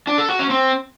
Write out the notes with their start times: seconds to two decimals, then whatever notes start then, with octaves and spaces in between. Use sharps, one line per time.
0.07 D4
0.18 A4
0.29 F#4
0.39 C#4
0.50 C4